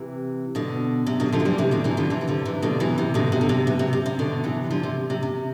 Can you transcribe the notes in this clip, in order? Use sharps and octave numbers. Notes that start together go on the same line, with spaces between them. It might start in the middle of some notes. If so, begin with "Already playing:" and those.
Already playing: C3 E3
B2 D3
C3
B2 D3
D3 F3
A3
E3 G3
C3 E3
B2 D3
C3 E3
D3 F3
C3 E3
E3
D3 F3
C3 E3
B2 D3
C3 E3
C3
B2 D3
C3
D3
C3
B2
C3
C3
C3
B2 D3
C3 E3
D3 F3
C3
C3
C3